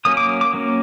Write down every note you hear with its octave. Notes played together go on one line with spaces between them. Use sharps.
F#3 A#3 C#4 D#6
D6
D6
F#3 A#3 C#4